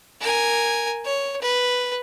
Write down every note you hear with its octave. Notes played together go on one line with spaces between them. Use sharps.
A#4 G#5
C#5
B4